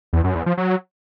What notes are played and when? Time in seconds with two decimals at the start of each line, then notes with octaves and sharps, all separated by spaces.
0.13 E2
0.24 F#2
0.35 E2
0.46 F3
0.57 F#3